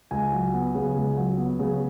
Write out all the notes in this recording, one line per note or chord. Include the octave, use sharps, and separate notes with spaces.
C#2 G#5
F#3
B3
C#3
C#2
F#3
B3
C#3